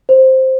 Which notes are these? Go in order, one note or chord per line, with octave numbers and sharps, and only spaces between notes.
C5